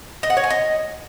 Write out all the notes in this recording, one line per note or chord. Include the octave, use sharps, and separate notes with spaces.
D#5
F#5
C#5
G#5
D#5